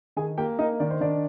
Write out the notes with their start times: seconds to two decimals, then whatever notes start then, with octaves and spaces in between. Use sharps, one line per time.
0.16 D#3 G#4 G#5
0.38 A#3 G4 G5
0.59 A#3 D#4 D#5
0.80 D#3 D5
0.90 C5
1.01 D#3 D4 D5